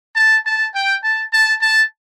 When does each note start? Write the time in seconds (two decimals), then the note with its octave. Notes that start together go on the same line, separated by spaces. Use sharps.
0.16 A5
0.45 A5
0.75 G5
1.04 A5
1.33 A5
1.62 A5